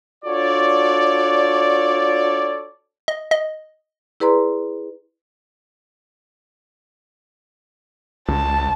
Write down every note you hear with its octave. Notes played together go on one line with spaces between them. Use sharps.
D4 F4 F#4 A4 C#5 D5
D#5
D#5
E4 G#4 B4 D5 A#5 C6
C#2 A5